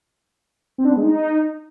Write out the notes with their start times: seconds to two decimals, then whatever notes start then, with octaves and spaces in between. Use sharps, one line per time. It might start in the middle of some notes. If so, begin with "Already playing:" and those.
0.78 C4
0.84 D4
0.91 B3
0.97 G#3
1.03 D#4